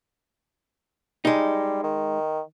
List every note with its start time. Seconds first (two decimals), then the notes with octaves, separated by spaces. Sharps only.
1.25 G3 G#3 D#4
1.83 D#3